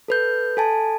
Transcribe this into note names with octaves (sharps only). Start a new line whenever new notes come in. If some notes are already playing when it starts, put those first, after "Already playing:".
A4 B4 G6
A4 G#5 A5